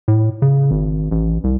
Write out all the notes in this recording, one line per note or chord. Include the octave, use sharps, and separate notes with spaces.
A2
C#3
G#1
A1
C2